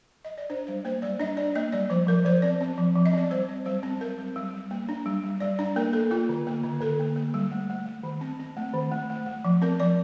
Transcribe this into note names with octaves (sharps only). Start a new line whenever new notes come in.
D#5
D5
D4 C5
G3 C5
A#3 C5
G3 D5
D4 D#5
D4 D5
A#3 D#5
G3 D5
F3 C5
F3 A#4
F3 C5
C4 D5
C4
F3
F3
D#5
C4 D5
G3 C5
C4
G3 C5
C4
G3 A#4
G3
G3
G3
A#3
D4
G3
G3
G3 D5
D4 D5
A#3 A#4
A#3 A4
A#3 F4
D3
A#3
D3
D3 A4
A#3
A#3
G3
A3
A3
A3
D#3
C4
C4
A3
D#3
A3
A3
A3
F3
C4 A#4
F3 D5